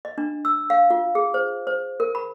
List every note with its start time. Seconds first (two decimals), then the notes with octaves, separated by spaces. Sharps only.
0.05 D#5
0.18 D4
0.45 E6
0.70 F5
0.90 F4
1.15 G#4
1.34 C5
1.67 C5
2.00 A#4
2.15 B5